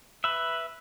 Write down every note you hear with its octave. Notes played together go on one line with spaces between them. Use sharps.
B4 E5